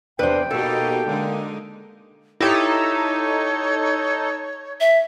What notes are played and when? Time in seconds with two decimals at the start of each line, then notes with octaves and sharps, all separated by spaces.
0.19 E2 C3 D4 B4 C5 G5
0.51 B2 A#3 D#4 G4 A4
1.07 D3 G#3 A#3 D#4
2.40 D#4 E4 G4 A4 C#5 D6
4.80 E5